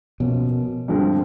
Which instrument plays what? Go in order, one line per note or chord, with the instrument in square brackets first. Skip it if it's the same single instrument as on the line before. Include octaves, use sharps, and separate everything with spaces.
[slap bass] B2 [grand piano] F3 A#3 C#4
[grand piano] G2 D3 F3 G#3 C4